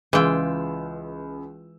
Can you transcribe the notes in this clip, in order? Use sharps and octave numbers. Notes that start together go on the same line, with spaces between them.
C#2 E3 G#3 F4 G5 E6